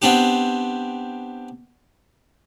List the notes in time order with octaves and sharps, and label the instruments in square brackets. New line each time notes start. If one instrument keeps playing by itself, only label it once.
[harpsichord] B3 C4 D4 G4